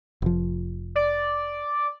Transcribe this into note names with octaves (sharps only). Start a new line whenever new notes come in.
F1 F3
D5